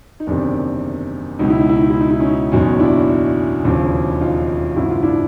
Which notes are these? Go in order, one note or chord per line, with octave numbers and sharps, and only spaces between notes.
D#4
F#1 E2 C3 D#3 D4
C#2 B2 F#3 D#4
E4
D#4
E4
D#4
E4
D#4
E4
C#4 D#4
F#1 E2 B2 F#3 C#4 D#4
D4 E4
E1 D#2 C#3 F3
D#4 F4
G#1 F#2 C#3 E4
F4
D4 E4